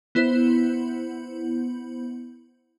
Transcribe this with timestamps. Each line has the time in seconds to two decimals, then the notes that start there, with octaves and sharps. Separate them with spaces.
0.15 B3 E4 C5